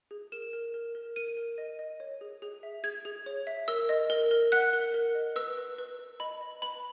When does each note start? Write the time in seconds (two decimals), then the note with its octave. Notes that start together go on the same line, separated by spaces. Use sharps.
0.11 G#4
0.32 A#4 E7
0.53 A#4
0.74 A#4
0.95 A#4
1.16 A#4 D#7
1.37 A#4
1.58 D#5
1.79 D#5
2.00 C#5
2.21 G#4
2.42 G#4
2.63 E5
2.84 G#4 G#6
3.05 G#4
3.26 C#5
3.47 E5
3.68 A#4 E6
3.89 D#5
4.10 A#4
4.31 A#4
4.52 F#5 F#6
4.73 A#4
4.94 A#4
5.15 D#5
5.36 B4 E6
5.57 B4
5.78 B4
5.99 B4
6.20 D#5 B5
6.41 D#5
6.62 B4 B5